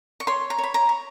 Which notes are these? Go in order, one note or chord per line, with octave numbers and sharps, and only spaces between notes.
C#6
C#5 C6
A#5
C#5 B5
A#5
C#5